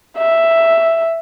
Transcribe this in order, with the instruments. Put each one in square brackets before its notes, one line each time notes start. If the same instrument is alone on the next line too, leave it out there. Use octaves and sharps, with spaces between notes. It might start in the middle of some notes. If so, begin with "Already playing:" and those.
[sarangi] E5